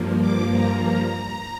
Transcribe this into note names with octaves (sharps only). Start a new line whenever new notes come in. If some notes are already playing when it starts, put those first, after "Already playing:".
Already playing: G2 F3 A#3
D6
A#5